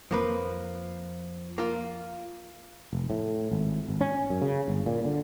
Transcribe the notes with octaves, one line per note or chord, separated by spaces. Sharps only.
F2 F3 A#3 B4
A#3 F4
F1
A2
G#1
G#1
C#4
F#2
C#3
G1
A#2
D3